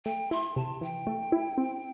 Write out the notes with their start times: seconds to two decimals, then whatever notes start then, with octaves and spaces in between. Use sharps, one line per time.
0.05 A3 G5
0.31 E4 C6
0.56 C3 A5
0.81 E3 G5
1.07 A3
1.32 E4
1.58 C4